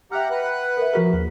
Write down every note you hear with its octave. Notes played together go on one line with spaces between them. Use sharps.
G4 E5 F#5 G5 A#5 F6
B4 F#5 F#6
A#4 E5
F3 F#4 G#4 A#4 B6
D#2